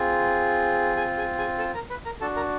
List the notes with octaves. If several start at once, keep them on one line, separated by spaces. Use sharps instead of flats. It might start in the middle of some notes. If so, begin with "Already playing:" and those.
Already playing: C4 F4 G#4
G#4 G#5
G#4 G#5
G#4 G#5
A4 A5
A#4 A#5
B4 B5
A#4 A#5
D4 F#4 A4 A5
A#4 A#5